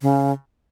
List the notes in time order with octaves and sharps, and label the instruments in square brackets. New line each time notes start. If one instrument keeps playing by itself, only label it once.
[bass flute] C#3